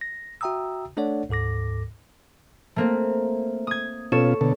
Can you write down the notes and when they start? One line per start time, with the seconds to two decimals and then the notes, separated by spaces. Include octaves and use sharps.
0.01 A#6
0.41 F#4 E5 G5 A#5 D#6 E6
0.97 A3 D4 A4 C#5 D5 F#5
1.29 D2 G#2 A4 D6 A#6
2.76 A3 A#3 C4
3.67 D#6 G#6
4.12 B2 C#4 F4 A4 C#5 E7
4.41 B2 D3 A4